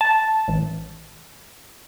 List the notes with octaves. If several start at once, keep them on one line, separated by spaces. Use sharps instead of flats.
A5
A1